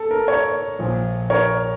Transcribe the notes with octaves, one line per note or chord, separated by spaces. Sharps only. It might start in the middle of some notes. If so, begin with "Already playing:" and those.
Already playing: A4
A#4
A#4 C#5
A#1 A#2 F3
A#4 C#5